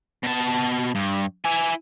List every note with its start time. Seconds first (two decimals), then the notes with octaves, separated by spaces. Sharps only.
0.24 B2 A5
0.95 G2
1.45 E4 G#5